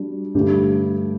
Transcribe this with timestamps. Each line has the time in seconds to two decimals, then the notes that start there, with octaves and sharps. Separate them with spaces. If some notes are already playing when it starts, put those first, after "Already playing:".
Already playing: G3 D4 F#4
0.35 G2 D3 A3 D4 G4